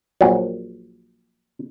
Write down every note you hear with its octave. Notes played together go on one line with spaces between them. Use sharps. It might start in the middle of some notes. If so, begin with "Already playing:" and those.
A#1 A#2 F#3